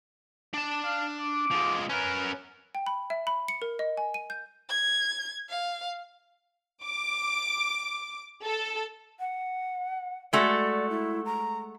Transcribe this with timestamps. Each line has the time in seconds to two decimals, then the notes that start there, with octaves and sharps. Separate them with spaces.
0.54 D4 A5
0.85 F5
1.20 D6
1.51 F3 G#3
1.90 C#4 A#4 B4
2.75 G5
2.87 B5
3.10 E5
3.27 B5
3.48 C#7
3.62 A#4
3.79 D#5
3.97 G#5
4.14 D#7
4.30 G6
4.69 G#6
5.49 F5
6.85 D6
8.44 A4
9.20 F#5
10.33 G#3 A3 F#4 D5
10.90 E4
11.25 A#5